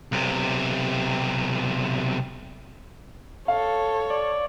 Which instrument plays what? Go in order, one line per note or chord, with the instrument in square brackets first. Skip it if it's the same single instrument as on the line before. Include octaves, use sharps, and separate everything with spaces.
[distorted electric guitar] B1 C3
[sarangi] A4 [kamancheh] C#5 [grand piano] F5
[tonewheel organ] D5